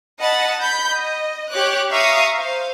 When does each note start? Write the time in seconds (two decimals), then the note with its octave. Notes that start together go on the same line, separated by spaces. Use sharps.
0.20 D#5 F#5 A5 B5
0.60 B5 G6
0.92 D#5
1.52 G4 C#5 D6 F#6
1.92 E5 F5 A#5 C#6 D#6
2.36 C5 F5